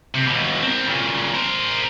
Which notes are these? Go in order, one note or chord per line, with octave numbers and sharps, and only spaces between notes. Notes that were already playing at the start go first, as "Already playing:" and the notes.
C3
D#2 B2
C4 A#4
A#2 C#3
A#4 C5